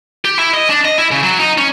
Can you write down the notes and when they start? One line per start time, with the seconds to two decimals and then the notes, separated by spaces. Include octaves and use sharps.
0.25 G4
0.39 E4
0.54 D#5
0.69 D4
0.85 D#5
0.98 E4
1.11 C#3
1.23 F#3
1.40 D#4
1.58 C#4